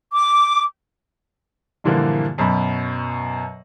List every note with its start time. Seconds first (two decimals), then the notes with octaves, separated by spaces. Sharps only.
0.13 D6
1.84 G2 A#2 D3 E3 F3 A#3
2.38 F#2 B2 B5